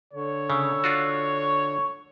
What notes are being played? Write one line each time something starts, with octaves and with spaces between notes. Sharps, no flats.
D3 C#5
C#3 E6
D4 F4 F#4
C#6